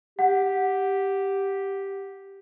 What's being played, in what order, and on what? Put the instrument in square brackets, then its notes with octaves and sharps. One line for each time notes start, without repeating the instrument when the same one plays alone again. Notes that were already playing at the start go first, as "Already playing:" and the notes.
[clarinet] G4 [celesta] F#5